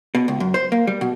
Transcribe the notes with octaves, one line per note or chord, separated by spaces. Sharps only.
B2
C#2
F#2
C5
A#3
G3
B2